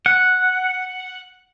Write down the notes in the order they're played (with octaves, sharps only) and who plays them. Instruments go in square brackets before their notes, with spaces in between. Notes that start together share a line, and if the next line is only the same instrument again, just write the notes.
[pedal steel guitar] F#5